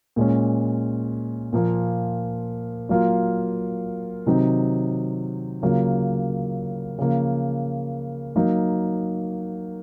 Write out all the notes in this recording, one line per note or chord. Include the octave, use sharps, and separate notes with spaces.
A#2 G#3 C#4
A#2 F3 A#3
F#3 A#3 F4
C3 D#3 F#3 C4 D#4
C#3 F#3 A#3 F4
C#3 F3 A#3
F#3 A#3 D#4